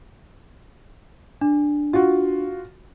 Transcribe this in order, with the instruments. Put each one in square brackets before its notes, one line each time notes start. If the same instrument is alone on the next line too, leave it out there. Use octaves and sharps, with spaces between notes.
[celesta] D4
[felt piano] F4 F#4